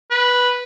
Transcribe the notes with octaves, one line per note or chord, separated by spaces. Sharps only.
B4